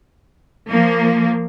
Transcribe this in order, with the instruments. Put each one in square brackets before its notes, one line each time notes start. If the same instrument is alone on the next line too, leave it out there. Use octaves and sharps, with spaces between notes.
[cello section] F3 A#3